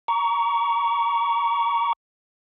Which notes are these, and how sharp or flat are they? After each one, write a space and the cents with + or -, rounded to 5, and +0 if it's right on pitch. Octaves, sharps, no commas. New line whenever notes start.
A#5 +5 C#6 +30